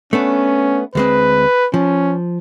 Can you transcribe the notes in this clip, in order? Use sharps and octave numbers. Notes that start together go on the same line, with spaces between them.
A3 B3 C#4 D4
D2 G#3 C4 B4
F3 C#4